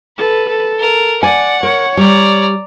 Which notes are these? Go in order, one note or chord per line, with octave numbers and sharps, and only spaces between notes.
A4 B4
A4
A#4
D5 F#5 G#5
A#4 C#5
G3 D5 A#5